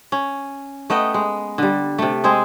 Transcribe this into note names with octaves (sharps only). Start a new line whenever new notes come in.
C#4
A3 B3 D#5 G5
G#3
D3 G3
C3 A3
G#3 C4 G#4